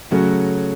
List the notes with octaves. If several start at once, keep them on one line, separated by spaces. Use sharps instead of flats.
C#3 F#3 A3 C#4 F#4